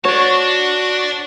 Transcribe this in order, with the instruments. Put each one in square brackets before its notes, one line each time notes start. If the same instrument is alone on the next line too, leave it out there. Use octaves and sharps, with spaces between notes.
[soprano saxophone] F#4 [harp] C#5 [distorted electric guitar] D5 A5